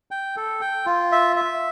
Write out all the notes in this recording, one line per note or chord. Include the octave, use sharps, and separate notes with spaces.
G5
A4
G5
F4
E5
E5